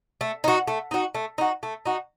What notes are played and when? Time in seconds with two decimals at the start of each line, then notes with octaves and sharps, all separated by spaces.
0.21 A3
0.44 D#4 F#4
0.68 A3
0.91 D#4 F#4
1.14 A3
1.38 D#4 F#4
1.63 A3
1.85 D#4 F#4